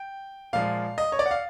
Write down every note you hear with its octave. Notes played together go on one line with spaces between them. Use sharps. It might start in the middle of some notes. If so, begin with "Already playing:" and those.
Already playing: G5
A#2 F3 G#3 F5
D#5
C#5
D5
F#5
F5